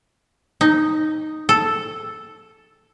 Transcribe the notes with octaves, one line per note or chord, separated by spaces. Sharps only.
D#4
A4